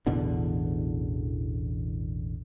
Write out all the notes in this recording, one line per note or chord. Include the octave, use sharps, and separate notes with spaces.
A1 E2 B2 D3